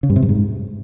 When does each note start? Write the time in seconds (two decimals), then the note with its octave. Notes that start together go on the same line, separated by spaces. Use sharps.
0.03 C#3
0.10 G2
0.16 C3
0.22 G2
0.29 G#2